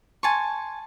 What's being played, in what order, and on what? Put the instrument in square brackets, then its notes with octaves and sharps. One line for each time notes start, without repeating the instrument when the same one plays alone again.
[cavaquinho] G#5 A5 C6 C#6